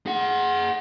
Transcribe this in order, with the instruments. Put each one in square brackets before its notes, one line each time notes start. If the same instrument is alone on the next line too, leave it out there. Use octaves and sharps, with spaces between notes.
[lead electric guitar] G#4 F#5